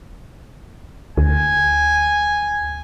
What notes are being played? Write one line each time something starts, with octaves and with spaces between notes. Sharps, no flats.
D2 G#5